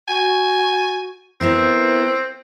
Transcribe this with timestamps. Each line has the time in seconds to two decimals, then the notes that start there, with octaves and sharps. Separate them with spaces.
0.08 F#4 G#5
1.41 B3 C4 E4 A#4 C5